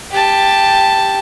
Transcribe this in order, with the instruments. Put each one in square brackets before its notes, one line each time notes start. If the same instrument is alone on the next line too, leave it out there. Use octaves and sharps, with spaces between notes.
[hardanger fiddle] G4 A5